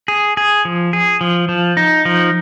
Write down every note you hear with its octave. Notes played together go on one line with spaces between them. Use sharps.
G#4
G#4
F3
G#4
F3
F3
D#4
F3